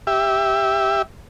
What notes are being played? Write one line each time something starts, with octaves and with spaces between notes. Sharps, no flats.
G4 E5